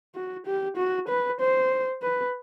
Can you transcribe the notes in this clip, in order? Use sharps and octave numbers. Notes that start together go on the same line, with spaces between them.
F#4
G4
F#4
B4
C5
B4